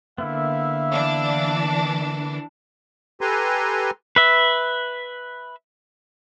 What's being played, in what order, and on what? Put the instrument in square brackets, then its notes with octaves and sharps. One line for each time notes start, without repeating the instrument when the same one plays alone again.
[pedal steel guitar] D3 A#3 B3 [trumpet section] E4 E5 F5
[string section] E3 D4
[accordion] G4 A4 B4 G#5 A#5 C6
[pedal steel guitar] B4 E5